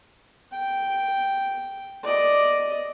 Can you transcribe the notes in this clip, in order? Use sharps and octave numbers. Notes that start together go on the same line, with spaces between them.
G5
D5 D#5